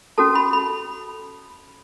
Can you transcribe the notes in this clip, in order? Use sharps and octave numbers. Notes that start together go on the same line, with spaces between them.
C#4 F#4 A4 A5
B5
B5